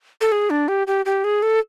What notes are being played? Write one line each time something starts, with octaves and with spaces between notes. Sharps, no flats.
A4
G#4
D4
G4
G4
G4
G#4
A4